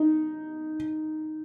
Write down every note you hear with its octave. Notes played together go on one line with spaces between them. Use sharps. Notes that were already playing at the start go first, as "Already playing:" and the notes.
Already playing: D#4